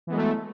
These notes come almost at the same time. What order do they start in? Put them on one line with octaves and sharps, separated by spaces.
E3 B3 G#3 F#3 A3